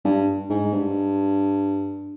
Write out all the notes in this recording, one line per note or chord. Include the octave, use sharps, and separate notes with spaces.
G2
G#2
G2